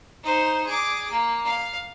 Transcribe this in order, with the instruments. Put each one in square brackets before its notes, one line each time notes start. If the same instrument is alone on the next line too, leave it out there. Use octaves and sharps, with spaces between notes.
[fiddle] D#4 C5
G#4 D6
A#3
F5